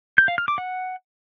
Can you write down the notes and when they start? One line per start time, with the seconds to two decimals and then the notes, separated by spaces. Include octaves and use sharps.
0.18 G6
0.28 F5
0.38 F6
0.48 D6
0.58 F#5